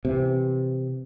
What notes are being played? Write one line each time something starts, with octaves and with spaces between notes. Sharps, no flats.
C3 E3